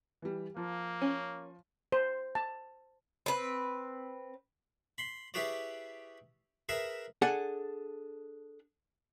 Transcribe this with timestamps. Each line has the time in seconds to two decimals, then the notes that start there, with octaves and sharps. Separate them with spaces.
0.22 E3 G3
0.57 F3 A#3
1.01 C#4
1.92 C5
2.35 A5
3.26 C4 B4
4.98 B5 C6
5.34 E4 G4 G#4 B4 C#5 D5
6.69 G#4 A#4 B4 E5 G#5
7.22 D4 G#4 A4 F#5